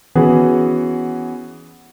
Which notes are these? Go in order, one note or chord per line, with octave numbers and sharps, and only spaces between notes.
E3 B3 C#4 F#4 G#4 B4